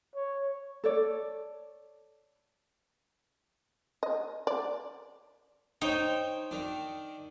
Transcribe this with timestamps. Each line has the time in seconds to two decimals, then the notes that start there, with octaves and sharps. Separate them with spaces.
0.15 C#5
0.84 A4 C#5 D5
4.03 D#5
4.47 D5
5.82 D#4 C5 C#5 G5
6.51 D#3 D4